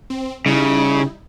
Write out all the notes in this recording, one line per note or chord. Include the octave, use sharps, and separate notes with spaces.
C4
C#3 G3 D#4 E4